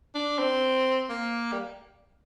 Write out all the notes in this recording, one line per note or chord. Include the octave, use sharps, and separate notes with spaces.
D4
C4
A#3
G3